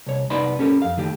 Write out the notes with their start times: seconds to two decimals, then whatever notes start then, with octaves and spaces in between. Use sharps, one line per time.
0.06 C2 C#5
0.30 C2 B3 D#4 D5 B5 C6
0.59 C#4 G4 A4 A#4
0.82 F2 F5
0.97 D#3 A3 G4